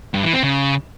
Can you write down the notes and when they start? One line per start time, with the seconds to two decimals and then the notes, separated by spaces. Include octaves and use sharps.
0.14 G2
0.23 E3
0.33 C4
0.43 C#3